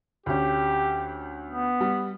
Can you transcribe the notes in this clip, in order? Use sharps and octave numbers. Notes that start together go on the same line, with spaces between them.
D2 C#4 G4
B3
G3